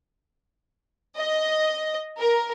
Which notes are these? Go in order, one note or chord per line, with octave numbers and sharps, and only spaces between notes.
D#5
A#4